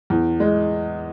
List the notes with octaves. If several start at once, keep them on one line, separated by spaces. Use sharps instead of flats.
E2
G#3